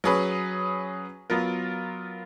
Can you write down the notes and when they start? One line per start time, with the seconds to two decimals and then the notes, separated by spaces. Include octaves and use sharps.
0.04 F#3 C#4 G#4 B4
1.30 F#3 B3 F4 A#4